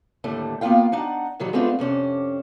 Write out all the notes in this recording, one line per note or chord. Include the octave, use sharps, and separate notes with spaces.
D#2 A2 D3 G3 A3
A#3 B3 C#4 F4 F5 G5
D4 D#4 F#5
A2 D#3 F#3 G3
G#3 A3 B3 C4 D4 F4
F2 C3 C#4 D4